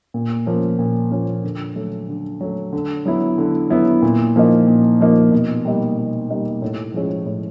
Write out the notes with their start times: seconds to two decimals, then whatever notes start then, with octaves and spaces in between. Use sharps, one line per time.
0.14 A#2
0.46 F3 A#3 C#4
0.79 A#2
1.11 F3 A#3 C#4
1.43 D3
1.76 F#3 A3
2.09 D3
2.41 F#3 A3
2.73 D3
3.05 F#3 B3 E4
3.38 D3
3.70 F#3 B3 E4
4.02 A#2
4.36 F3 A#3 D#4
4.68 A#2
5.01 F3 A#3 D#4
5.32 B2
5.65 G3 A#3 D#4
5.98 B2
6.30 G3 A#3 D#4
6.62 A2
6.94 F3 G#3 C#4
7.26 A2